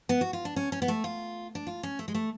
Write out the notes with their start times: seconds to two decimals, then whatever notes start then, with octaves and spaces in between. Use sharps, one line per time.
0.09 B3
0.21 F#4
0.33 F4
0.45 D4
0.56 C#4
0.72 C#4
0.82 B3
0.88 A3
1.04 F4
1.55 D4
1.67 F4
1.83 C#4
1.99 A3
2.08 G#3
2.14 A3